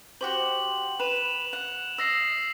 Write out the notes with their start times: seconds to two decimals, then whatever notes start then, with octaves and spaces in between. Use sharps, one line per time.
0.21 F#4 G4 C5 F#7
1.00 B4 E7 F7
1.53 F#5
1.98 D#5 E6 A#6 C7